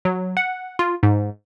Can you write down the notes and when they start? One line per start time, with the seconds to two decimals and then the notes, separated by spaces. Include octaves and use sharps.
0.05 F#3
0.37 F#5
0.79 F4
1.03 G#2